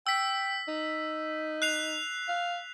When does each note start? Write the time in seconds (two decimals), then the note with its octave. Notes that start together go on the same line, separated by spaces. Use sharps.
0.07 G5 E6 B6
0.68 D#4
1.62 F#6 C7 F7
2.29 F5